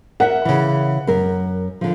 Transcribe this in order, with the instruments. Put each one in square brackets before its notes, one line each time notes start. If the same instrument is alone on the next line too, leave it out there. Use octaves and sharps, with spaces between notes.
[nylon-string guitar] A#4 E5 [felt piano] F#5
[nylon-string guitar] C#3 E3
F#2 A#4
D3 F3